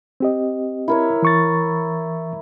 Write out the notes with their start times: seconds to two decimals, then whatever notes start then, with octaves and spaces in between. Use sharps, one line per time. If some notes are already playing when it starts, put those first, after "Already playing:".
0.20 C4 G4 D#5
0.88 E4 A#4 C#5
1.22 E3 C#6 A6